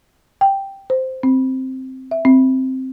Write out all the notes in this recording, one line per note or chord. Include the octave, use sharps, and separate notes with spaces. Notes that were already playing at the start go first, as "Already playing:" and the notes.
G5
C5
C4
E5
C4